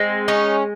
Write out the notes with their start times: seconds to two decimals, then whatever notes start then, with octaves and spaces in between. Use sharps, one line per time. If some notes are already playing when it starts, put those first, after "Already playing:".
Already playing: G#3 C4
0.28 C#4 D#4